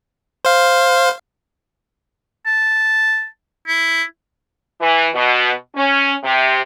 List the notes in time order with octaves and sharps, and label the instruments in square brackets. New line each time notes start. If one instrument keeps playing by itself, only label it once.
[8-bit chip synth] C5 F5
[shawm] A5
E4
[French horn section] E3
B2
C#4
C3